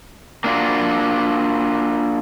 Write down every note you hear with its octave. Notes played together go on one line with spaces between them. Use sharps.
A#3 D4 F4 F#4